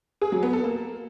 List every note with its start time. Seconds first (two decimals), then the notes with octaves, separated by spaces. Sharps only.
0.22 G#4
0.32 F#3
0.43 B3
0.53 A4
0.64 A#3